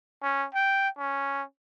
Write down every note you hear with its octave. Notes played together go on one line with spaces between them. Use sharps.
C#4
G5
C#4